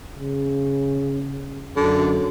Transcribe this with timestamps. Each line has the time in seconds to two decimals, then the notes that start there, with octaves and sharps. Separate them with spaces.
0.14 C#3
1.76 F#2 D3